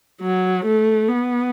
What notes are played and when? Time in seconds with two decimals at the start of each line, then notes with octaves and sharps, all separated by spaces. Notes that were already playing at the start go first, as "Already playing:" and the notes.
0.21 F#3
0.65 A3
1.09 B3